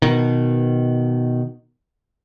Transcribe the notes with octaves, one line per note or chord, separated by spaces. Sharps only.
B2 D#3